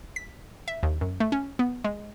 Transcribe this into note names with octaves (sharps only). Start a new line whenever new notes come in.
B6
E5
D#2
F#2
A3
C#4
B3
G#3